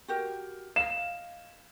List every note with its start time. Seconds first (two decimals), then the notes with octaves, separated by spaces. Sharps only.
0.08 F#4 G4 A#4
0.76 D#5 F5 E7